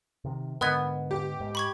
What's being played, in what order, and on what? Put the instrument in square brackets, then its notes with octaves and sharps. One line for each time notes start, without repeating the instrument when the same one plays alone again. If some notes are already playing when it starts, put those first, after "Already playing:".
[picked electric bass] C3 D#3
[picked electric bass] G#2 D3 [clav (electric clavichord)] B3 [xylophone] A#4 D#5 G#6
[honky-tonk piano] G4
[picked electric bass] G#2
[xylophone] B5 C#6 G#6